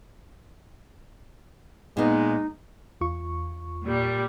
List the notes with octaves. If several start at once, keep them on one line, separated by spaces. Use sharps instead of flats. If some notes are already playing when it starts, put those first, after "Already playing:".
A#2 G#3 B3 D#4
E2 F4 C#6
A#2 G3